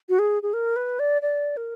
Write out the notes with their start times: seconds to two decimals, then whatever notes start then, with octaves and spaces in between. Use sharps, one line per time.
0.09 F#4
0.19 G#4
0.43 G#4
0.54 A#4
0.76 B4
0.99 D5
1.22 D5
1.57 A#4